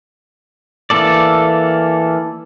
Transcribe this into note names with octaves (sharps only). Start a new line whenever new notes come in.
E3 A#3 A4 D5